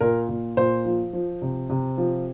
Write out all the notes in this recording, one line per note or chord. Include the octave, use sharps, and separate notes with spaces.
A#2 A#4
A#2
A#2 C5
F3
F3
C3
C3
F3